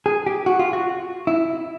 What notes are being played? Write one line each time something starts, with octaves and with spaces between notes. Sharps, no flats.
G#4
G4
F#4
F4
F#4
E4